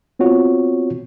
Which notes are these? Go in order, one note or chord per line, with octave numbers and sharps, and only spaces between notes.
B3 C4 F4 F#4 C#5